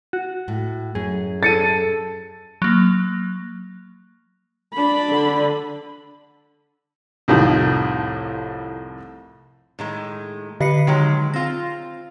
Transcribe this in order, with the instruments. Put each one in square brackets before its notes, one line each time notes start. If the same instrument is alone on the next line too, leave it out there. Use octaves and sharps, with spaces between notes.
[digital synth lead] F#4
[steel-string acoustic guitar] A2
[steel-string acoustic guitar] F#2 [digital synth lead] G#4
[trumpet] A4 [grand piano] A6 C#7 D#7
[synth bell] F#3 A#3
[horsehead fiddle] D4 B5
[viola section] D3
[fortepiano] C2 F2 A2 D#3 F3
[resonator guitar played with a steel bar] A2 D#3 G#3
[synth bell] D3 C7 C#7 [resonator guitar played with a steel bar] B4 D#5
[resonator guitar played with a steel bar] D#3 F#3 G#3
[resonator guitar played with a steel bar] C4 F4 [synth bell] A#6